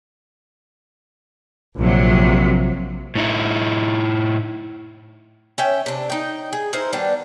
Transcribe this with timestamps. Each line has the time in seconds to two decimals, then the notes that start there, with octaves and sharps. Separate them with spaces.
1.77 A#1 C3 F#3
3.15 A2 D#4 E4
5.58 C#4 E5 G5
5.86 C3 D4
6.10 D#4 G5
6.53 G#4
6.73 D#4 E4 A#4 C5
6.93 D#3 G3 B3 D4